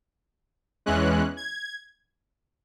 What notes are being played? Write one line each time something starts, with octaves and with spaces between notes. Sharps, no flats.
E2 E3 G#3 C#4 F#6
G#6